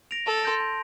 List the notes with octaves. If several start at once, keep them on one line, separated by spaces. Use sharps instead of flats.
A#6 D7 F7
A4 A5
C6 G6 A#6 D7
A5